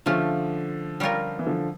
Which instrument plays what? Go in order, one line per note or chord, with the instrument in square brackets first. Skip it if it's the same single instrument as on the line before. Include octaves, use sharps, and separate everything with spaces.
[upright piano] D3 F3 [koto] A3 C#4 F4
[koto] G3 C#4 F4 A#4
[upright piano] E3
D3 F3